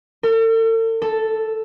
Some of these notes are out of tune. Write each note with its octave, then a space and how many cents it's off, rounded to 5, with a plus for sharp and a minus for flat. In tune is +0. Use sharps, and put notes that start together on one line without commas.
A4 +45
A4 +0